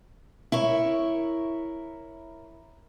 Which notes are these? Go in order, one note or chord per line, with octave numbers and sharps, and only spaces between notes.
E4 A#4 C#5